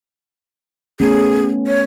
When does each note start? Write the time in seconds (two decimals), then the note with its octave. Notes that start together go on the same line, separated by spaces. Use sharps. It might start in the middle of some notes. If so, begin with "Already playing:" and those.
1.00 A3 B3 C#4 G#4
1.67 C#5